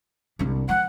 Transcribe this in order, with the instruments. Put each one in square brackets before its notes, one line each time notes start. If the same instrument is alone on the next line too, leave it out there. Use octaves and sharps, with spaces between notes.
[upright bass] C2 D4
[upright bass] F3 [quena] F#5